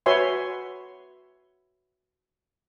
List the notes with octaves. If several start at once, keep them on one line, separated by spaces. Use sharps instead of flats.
F#4 B4 C#5 E5 G#5 C6